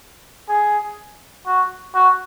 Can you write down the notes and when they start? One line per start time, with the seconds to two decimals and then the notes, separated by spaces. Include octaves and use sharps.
0.49 G#4
1.46 F#4
1.94 F#4